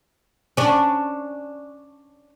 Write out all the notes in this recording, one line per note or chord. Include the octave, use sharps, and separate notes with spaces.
C#4 D4